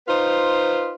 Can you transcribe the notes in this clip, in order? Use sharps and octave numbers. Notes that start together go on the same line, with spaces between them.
D#4 F4 B4 C5